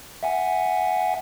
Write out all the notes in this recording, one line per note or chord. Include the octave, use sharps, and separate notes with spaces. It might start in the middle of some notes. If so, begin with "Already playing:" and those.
E5 F#5 G#5